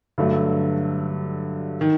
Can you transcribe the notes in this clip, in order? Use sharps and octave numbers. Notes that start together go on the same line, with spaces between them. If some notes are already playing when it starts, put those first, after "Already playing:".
G2 D3 F#3 A3
D#3